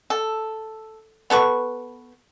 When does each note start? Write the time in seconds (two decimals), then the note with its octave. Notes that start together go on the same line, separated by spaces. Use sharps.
0.10 A4
1.30 B3 A4 B4 C#6